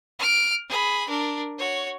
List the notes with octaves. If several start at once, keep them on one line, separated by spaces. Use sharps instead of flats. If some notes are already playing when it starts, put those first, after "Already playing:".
F6 D7
G#4 B5
D4 A#4
F#4 C#5